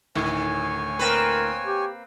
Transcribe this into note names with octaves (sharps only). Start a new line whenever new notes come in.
D2 A2 D#3 C#5 G#5
A#3 C4 A#4 B4
G4